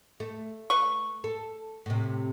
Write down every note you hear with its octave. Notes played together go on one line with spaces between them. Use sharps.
A3
B4 C#6
A4
A2 C3